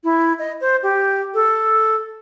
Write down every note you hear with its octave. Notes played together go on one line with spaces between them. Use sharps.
E4
D#5
C5
G4
A4